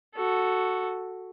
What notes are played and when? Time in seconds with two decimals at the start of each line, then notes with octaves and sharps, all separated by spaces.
0.15 F#4 A4